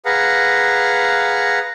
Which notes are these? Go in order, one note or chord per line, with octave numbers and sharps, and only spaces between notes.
G#4 B4 F5 F#5 A#5